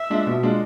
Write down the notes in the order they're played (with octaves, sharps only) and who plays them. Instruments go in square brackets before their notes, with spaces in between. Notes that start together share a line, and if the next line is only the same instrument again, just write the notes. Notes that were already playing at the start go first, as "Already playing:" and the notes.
Already playing: [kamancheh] E5
[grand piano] G#3 D4 F4
B2
G#3 D4 F4